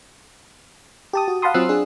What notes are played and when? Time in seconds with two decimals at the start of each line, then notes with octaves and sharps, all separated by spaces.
1.13 G4 A5 D#6
1.28 F#4
1.42 F5 F#5 A5 B5 C6 D#6
1.54 F#3 C4 F4 E6 F#6 C7
1.69 D4 G#4